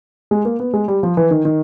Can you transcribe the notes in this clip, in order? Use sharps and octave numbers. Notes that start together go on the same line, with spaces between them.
G#3
A#3
B3
G#3
G3
F3
E3
D#3
D#3